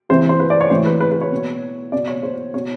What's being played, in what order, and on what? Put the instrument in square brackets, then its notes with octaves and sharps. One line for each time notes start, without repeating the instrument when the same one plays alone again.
[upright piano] C3 E3 C5
C5
B4
D5
C#5
A2 E3 C5
B4
B4
B4
C#5
B2
B2 D5
C#5
C5
B2 C#5